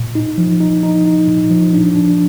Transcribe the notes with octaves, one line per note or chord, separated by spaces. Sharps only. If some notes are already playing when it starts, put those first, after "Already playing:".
Already playing: A#2
D#4
F3
D#4
D#4
D#4
A#2
F3
D4
D4